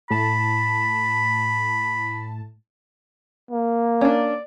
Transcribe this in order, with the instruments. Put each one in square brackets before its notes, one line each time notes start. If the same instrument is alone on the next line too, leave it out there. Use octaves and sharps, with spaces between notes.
[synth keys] A2 A5 [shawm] B5
[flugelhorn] A#3
[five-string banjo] C#4 D4 [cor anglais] D5